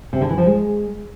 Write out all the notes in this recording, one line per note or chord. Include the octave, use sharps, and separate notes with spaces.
C3
D3
E3
F3
G#3